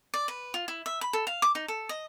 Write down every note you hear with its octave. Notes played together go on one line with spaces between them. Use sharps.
D5
B4
F4
E4
E5
B5
A4
F5
D6
D#4
A4
D#5